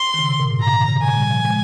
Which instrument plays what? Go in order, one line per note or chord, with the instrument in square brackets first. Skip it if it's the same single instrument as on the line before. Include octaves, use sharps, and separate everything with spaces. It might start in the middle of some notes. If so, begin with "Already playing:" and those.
Already playing: [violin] C6
[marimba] D#3
C#3
C3
A#2
G#2
[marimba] C3 [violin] A#5
[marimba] D#3
C#3
[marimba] A#2 [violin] G#5
[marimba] G3
F3
G#3